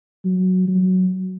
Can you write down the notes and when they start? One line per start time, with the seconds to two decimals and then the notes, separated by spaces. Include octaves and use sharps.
0.25 F#3
0.68 F#3